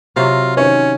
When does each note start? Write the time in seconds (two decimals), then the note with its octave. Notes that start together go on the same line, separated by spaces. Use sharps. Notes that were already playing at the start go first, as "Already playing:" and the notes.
0.16 C3 F#3 F4
0.57 D#3 C#4 C5 C#5